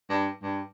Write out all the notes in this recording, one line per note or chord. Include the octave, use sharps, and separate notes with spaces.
G2
G2